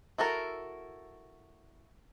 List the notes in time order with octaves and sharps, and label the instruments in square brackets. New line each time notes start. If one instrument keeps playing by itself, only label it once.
[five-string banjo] E4 F#4 A4 A#4